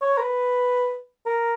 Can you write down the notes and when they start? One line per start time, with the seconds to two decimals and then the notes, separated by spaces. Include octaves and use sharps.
0.01 C#5
0.18 A#4
0.22 B4
1.26 A#4